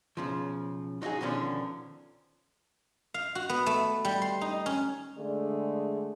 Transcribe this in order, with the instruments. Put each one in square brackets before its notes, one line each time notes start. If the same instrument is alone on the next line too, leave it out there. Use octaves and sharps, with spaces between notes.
[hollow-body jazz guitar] B1 C#3 F3
F#3 D#4 F4 F#4 G#4
B2 D3 D#3 F3 C#4 D4
[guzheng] F5
F#4
B3
A3
G3
C6
D#4
C#4
[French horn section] D3 G#3 A3 G#4 D5